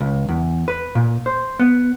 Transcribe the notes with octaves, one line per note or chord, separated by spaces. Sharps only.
C#2
E2
B4
A#2
C5
B3